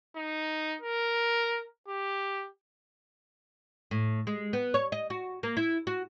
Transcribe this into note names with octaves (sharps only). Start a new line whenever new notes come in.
D#4
A#4
G4
A2
G#3
B3
C#5
D#5
F#4
A#3
E4
F#4